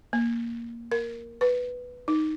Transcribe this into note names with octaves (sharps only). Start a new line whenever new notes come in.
A#3
A#4
B4
D#4